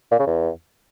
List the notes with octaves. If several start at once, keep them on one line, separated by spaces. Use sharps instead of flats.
A#2
C#3
E2